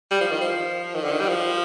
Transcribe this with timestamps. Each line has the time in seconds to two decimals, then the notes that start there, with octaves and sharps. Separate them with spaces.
0.11 G3
0.20 F3
0.31 D#3
0.41 F3
0.95 D#3
1.03 D3
1.12 D#3
1.20 G3
1.28 F3